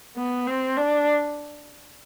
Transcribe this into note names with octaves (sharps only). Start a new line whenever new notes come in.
B3
C4
D4